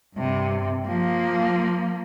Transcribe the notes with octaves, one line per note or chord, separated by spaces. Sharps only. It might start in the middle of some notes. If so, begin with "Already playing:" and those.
G2 C3
F3 A#3